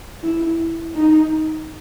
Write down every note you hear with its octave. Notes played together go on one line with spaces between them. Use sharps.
E4
D#4